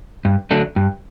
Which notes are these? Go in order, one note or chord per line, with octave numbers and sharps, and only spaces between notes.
G2
D3 F#3 A3 D4
G2